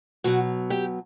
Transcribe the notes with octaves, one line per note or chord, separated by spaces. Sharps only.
B2 F#3 F#4 F#5
G4 G5